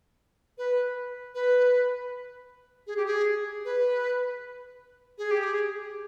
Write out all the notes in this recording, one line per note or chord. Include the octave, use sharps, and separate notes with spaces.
B4
B4
G#4
G4
G#4
B4
G#4
G4
G#4